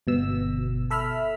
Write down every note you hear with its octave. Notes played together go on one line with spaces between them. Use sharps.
G1 B2 E6
A4 E5 B5 E6 F6